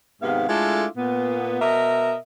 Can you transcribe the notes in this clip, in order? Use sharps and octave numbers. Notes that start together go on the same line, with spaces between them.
G#2 C3 D#3 B3 F5
G#3 A3 D4 E4 F4 A4
A#2 B3
B2 A#4 D#5 E5